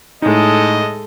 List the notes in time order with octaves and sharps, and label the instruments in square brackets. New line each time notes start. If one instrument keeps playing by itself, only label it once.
[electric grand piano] A2 D#4 [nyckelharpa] G#3 A4 [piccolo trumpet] D#5